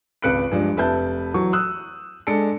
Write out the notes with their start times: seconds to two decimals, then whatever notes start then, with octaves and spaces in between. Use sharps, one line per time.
0.22 G#1 C#2 B4 F#6 C#7 D7
0.51 G2 F3 G#3 D4
0.77 F1 B4 E5 A5 G6
1.34 E3 F#3 C#6
1.53 D#6 E6 F#6
2.27 G#3 D4 A4 A5 C#7